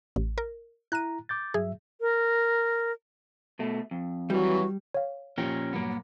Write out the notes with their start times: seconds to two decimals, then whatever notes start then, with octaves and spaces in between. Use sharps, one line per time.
0.16 A1
0.38 A#4
0.92 E4 A#5 F#6 D#7
1.29 D6 G6 A6
1.54 G2 F#3 G#4 E5
2.01 A#4
3.59 B2 A3
3.91 F2
4.30 E3 F#3 G3 F#4
4.94 C#5 F5
5.38 A#2 F3 C#4 G4 A#4 G5
5.73 G2 A#2 F#3 A#3 B3